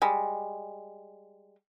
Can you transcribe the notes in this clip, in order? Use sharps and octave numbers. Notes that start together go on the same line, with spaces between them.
G3 G#3